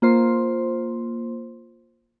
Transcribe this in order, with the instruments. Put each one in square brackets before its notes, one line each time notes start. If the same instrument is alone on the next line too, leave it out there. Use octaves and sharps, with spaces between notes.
[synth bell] A#3 F4 C5 C6